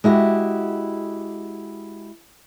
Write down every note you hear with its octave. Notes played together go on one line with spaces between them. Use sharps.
G#3 E4 F#4 G4